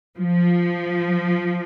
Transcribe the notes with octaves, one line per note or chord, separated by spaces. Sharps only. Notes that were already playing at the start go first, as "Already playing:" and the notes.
F3